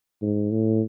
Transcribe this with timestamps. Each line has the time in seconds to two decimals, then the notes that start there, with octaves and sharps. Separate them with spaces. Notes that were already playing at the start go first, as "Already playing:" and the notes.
0.22 G#2
0.51 A2